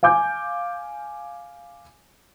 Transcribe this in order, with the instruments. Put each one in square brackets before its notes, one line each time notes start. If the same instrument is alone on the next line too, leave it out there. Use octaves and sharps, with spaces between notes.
[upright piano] F5 G#5 D6 G6